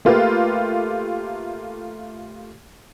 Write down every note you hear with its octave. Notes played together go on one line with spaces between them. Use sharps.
A3 A#3 F4 G4 B4